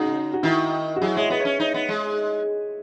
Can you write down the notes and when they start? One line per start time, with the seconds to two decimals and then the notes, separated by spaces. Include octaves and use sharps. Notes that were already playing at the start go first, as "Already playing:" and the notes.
Already playing: C#3 D#4 F#4
0.33 F#4
0.43 D#3 E4
0.96 F#4
1.01 F#3 E4 G#4
1.16 G#3 C#5 E5
1.30 B3 B4 D#5
1.40 C#5 E5
1.45 C#4
1.60 D#4 C#5 E5
1.74 B3
1.89 G#3